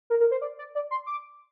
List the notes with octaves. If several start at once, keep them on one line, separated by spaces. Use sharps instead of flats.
A#4
A#4
C5
D5
D5
D5
C6
D6